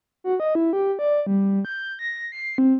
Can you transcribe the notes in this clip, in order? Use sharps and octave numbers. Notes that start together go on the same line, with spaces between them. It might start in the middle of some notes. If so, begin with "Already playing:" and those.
F#4
D#5
E4
G4
D5
G3
G6
A#6
C7
C4